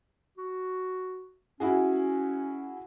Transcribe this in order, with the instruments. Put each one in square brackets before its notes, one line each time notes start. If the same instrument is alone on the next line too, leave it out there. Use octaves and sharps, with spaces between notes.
[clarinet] F#4
[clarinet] C#4 [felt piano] E4 F#4 G#4